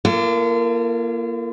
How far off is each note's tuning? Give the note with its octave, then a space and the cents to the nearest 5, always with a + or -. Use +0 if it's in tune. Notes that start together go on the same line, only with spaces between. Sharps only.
A#3 +10 F4 -40 A4 +30